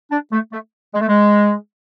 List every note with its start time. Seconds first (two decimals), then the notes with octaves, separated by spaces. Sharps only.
0.11 D4
0.32 A3
0.52 A3
0.94 G#3
1.01 A3
1.09 G#3